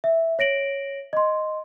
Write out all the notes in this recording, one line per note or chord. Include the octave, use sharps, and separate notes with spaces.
E5
C#5 A#6 D7 F#7
D#5 C6